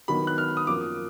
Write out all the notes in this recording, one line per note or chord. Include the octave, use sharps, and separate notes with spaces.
D#3 F#3 B3 D#4 F#4 B5
F#6
F6
D#6
F#2 F3 A#3 D6